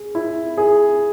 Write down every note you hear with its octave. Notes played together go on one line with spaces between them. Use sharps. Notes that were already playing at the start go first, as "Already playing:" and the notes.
Already playing: G#4
E4
G#4